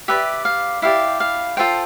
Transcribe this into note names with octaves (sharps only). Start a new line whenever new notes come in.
G4 B4 D5 E5
F5
E4 G4 D5 F5
F5
F4 A4 C5 G5